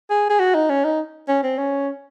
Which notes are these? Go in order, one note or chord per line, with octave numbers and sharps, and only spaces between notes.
G#4
G#4
F#4
D#4
C#4
D#4
C#4
C4
C#4